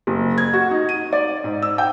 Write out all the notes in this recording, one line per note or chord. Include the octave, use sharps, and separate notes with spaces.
F#1
G#6
F#4
D#4
D#7
D5
G#2
E6
G5